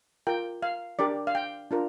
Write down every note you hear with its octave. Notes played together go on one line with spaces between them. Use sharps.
F4 A#4 G5
F5
D4 G4 A#4 D5
F5
G5
D4 F4 A#4